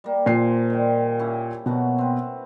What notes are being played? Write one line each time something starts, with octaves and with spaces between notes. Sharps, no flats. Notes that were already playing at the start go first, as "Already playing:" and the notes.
G3 A#3
A#2 F3 C7
D#3 G3
C#4 E4 G4
B2 F#3 A#3 F#5
C4 B4